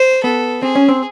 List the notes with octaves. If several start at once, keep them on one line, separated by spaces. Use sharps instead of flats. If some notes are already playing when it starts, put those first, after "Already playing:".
Already playing: C5
B3 A4
C4 G#4
C#4
C4